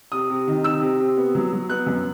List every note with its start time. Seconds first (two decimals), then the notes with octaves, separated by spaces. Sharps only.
0.12 C3 D#6
0.30 C3
0.47 D#3
0.64 C3 E6
0.81 C3
1.00 C3
1.17 B3
1.35 F#3
1.52 F#3
1.70 B3 F#6
1.86 F#2